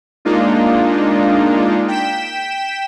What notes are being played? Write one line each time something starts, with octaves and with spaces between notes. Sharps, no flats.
G#3 A#3 D4 D#4 F4
G5 B6 E7